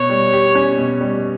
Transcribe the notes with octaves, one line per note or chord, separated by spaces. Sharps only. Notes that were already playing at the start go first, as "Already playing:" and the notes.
Already playing: B2 C#5
G3
G4
C#4
B2
G3